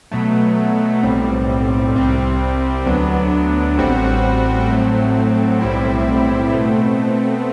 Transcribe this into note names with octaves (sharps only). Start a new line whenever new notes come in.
B2 F#3 A3
B1 A2 G3 C4
C2 C3 G3 C4
D2 D3 F#3 B3 D4
A1 A2 G3 C4 F#4
A2 F#3 A3 C4
B1 A2 G3 C4 E4
B2 A3 C4